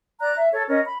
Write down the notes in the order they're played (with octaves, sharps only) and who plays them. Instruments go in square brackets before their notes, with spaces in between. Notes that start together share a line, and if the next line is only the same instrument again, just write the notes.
[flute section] D5 A#5 F#6
E5
A4 C#5
C#4 A#4 D#5
B5